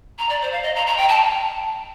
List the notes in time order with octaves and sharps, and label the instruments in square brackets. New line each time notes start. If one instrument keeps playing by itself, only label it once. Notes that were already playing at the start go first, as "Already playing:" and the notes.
[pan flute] A#5
D5
C5
F5
D#5
A#5
A#5
G5
A5